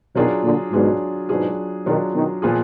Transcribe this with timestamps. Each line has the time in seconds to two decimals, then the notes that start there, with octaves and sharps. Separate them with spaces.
0.15 B2 D#3 F#3 D4 F4 G#4
0.44 A#2 D3
0.72 G#2 B2 F#3 D4 F4 G#4
1.29 G#2 B2 F#3 D4 F4 G#4
1.86 B2 D#3 F#3 D4 F4 G#4
2.14 B2 D#3
2.42 A#2 F3 B3 F4 G#4